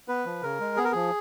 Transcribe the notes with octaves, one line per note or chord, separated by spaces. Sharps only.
B3 B4
F3
C#3 A#4
G#3
B3 G#4
A#4
F3 G#4